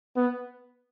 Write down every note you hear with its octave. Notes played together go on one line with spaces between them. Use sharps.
B3